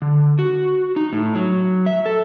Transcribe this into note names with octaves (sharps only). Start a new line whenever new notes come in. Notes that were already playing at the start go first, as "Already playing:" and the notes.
D3
F#4
D#4
A2
F#3
E5
A4